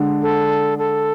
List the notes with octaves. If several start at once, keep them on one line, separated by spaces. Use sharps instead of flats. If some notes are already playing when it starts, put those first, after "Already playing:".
Already playing: D3 G#3 D4
A4
A4